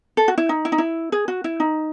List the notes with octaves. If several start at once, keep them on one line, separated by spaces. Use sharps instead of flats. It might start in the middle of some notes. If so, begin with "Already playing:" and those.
A4
F#4
E4
D#4
E4
D#4
E4
G#4
F#4
E4
D#4